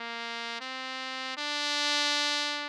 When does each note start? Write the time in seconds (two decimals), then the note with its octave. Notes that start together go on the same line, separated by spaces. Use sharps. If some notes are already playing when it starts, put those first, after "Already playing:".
Already playing: A#3
0.61 C4
1.37 D4